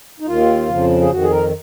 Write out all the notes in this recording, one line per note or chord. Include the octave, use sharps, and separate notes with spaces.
D#4
D#2 D#3 F4
F2 C#3 F3
G#4
F2 D#3 F#4
G#4
A#4